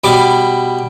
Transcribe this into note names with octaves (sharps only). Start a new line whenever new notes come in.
B2 G3 B5 D6